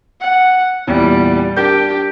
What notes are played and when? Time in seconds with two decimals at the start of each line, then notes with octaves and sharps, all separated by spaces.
0.21 F#5
0.87 E2 A#2 G3
1.56 D4 G4 A#4 G6